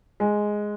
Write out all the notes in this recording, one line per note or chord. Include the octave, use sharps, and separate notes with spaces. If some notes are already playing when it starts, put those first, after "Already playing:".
G#3